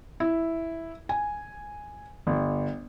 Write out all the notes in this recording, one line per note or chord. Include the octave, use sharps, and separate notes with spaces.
E4
G#5
G1